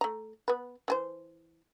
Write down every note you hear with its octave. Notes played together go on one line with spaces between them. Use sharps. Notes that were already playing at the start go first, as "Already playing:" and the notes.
A3 A#5
B3 B4
E3 G#4 C5